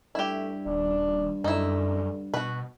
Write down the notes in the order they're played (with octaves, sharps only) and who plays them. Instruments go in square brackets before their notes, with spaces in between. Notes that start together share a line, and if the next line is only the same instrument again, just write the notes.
[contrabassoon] G2 [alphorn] A3 [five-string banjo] E4 G4
[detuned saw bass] D#1 [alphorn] D4
[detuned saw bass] F#2 [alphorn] D3 [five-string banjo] D#4 E4
[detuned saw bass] B2 [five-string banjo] F#4 B4